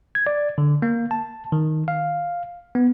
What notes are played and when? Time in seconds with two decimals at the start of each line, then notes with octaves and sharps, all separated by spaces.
0.15 G#6
0.27 D5
0.58 D3
0.82 A#3
1.11 A5
1.52 D#3
1.88 F5
2.75 B3